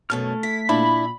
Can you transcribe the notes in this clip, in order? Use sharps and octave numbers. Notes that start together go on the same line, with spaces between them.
F#2 B2 A3 C#4 A4 F6
E4 B6
A#2 D4 E4 B5